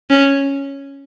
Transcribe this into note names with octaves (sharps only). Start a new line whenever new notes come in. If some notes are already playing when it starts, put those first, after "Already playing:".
C#4